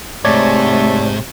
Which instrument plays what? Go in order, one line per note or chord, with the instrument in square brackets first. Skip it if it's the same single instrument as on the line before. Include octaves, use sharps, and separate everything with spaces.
[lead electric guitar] G#2 [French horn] C3 [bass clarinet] A3 [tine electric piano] C#5 D5 G#6